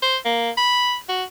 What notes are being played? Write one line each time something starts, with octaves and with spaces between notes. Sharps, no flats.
C5
A#3
B5
F#4